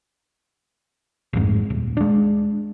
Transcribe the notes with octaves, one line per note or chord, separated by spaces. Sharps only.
A1 F2 G#2
D#1
G#3 D4